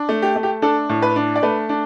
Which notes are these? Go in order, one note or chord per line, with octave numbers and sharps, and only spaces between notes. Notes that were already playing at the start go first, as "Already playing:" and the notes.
Already playing: D4
A3
G4
A3
G4
D4 A4
A2
B4
D4
D5
A3 B4
D4